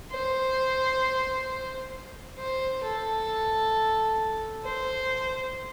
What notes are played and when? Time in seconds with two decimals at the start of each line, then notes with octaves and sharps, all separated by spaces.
0.12 C5
2.38 C5
2.84 A4
4.65 C5